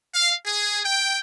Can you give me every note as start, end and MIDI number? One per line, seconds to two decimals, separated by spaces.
0.13 0.32 77
0.45 0.80 68
0.84 1.19 79